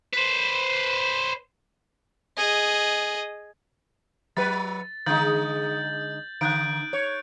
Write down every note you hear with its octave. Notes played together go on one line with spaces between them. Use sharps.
B4 C5
G#4 D#5
F#3 B4 A6
D3 G#3 D#4 G6 A6 F#7
D3 F#6 G6 D7
C#5